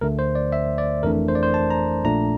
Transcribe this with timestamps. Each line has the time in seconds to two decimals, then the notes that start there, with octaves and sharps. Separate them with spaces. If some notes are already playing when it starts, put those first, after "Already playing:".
0.01 D2 D3 A3 A#4
0.19 C5
0.35 D5
0.52 E5
0.78 D5
1.03 G1 F2 E3 A3 D4 A#4
1.28 C5
1.35 D5
1.43 C5
1.54 A5
1.70 A#5
2.04 A#1 A#2 A3 D4 A#5